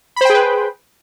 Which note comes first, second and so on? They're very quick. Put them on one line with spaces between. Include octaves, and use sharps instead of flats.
B5 C5 G5 G#4 B4